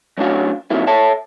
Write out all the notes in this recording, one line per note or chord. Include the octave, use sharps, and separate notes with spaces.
F#3 A3 C#4 D4 F#4 F5
F2 C3 D#3 F#3 A#3 E4
A4 C#5 E5 A5